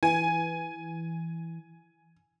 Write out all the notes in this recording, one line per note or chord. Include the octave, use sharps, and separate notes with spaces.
E3 G#5